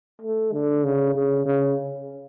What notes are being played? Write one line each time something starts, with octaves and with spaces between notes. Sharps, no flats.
A3
D3
C#3
C#3
C#3